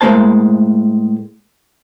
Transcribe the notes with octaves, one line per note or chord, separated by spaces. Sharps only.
A2 G#3 A#3 C#4 C5 A5